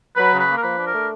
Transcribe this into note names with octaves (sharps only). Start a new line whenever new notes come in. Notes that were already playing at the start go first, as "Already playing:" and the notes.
F#3 B4
C#3
B4
A#3
A#4
F3 B4
D4
A#4
A3